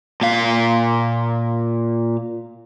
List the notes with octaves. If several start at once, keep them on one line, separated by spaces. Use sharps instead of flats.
A#2 F5